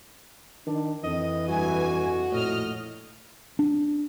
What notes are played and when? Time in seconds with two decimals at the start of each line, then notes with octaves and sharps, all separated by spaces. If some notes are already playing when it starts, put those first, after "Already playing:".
0.67 D#3 D4
1.03 F2 E3 D#5
1.48 G2 F#4 G#5
2.32 A#1 A2 D#5 F6
3.59 D4